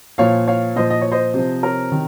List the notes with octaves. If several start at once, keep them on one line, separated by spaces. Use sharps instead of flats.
A#2 F3 C#5 F5
C#5 F5
A#2 F3 C5 D#5
D#5
C#5
C5 D#5
C3 F3
A#4 C#5
C3 D#3